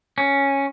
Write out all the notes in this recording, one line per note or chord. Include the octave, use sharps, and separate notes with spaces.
C#4